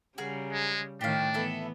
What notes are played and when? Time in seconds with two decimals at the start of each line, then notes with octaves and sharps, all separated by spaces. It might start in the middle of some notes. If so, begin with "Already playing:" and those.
0.18 C#3 G3 F#4 G#4 A#4
0.52 G#3
1.01 A2 D#3 D4 G4 F5
1.34 E3 B3 E4 A4